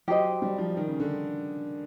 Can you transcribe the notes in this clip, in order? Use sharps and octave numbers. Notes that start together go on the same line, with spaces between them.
F#3 G4 C5 D#5
G3
F3
D#3
C#3
D3